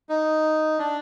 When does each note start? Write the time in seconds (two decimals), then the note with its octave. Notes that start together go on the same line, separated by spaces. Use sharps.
0.09 D#4
0.79 D4